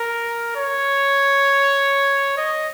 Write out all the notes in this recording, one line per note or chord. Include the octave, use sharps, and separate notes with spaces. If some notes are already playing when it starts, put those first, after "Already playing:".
Already playing: A#4
C#5
D#5